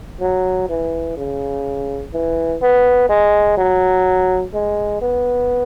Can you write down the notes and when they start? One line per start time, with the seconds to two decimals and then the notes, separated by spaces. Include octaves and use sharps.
0.21 F#3
0.69 E3
1.17 C#3
2.13 E3
2.62 B3
3.09 G#3
3.57 F#3
4.54 G#3
5.01 B3